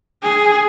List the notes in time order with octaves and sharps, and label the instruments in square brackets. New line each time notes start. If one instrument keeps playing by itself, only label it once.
[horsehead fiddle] G#4